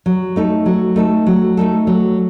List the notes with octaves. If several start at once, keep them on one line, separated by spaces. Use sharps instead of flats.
F#3
A3 D#4 A4
F#3
A3 D#4 A4
F#3
A3 D#4 A4
F#3